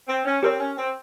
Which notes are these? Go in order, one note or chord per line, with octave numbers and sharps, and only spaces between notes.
C4
C#4
C4 G4 A#4 C#5
C#4
C4